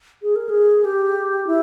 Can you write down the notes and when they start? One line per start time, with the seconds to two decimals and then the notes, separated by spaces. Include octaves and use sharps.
0.22 G#4
0.36 A#4
0.49 G#4
0.85 G4
1.47 E4